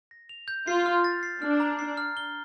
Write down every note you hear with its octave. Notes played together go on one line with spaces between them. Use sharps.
A#6
F7
G6
F4 C7
F6
A6
C7
D4 F6
A#5
C7
F6
G7